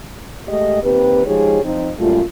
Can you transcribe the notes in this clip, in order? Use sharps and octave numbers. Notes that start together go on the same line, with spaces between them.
G#3 A3 G4 D#5
D#2 C4 G4 B4
F3 G#3 D#4 G4 G#4 C#5
F3 C4 D#4
F#2 A#2 G3 A3 F4